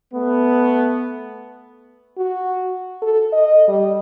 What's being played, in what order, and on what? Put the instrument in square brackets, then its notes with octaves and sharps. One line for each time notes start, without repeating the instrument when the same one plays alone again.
[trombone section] A3 B3
[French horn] F#4
A4
D#5
G3